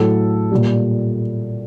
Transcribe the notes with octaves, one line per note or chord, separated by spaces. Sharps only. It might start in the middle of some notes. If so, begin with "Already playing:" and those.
Already playing: A2 F#3 A4
A#2 G3